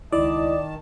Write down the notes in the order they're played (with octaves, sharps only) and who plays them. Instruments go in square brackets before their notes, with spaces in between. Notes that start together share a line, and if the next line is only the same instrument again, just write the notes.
[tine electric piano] C#2 E4 [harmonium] D#3 A5 [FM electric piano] D5 [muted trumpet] D#5